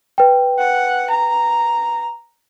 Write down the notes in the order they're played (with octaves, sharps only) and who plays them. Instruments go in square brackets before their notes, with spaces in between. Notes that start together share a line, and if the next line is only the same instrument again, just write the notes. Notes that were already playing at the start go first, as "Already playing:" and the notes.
[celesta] B4 G5
[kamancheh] F#5
A#5